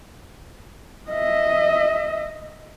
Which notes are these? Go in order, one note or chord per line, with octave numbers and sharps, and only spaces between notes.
D#5 E5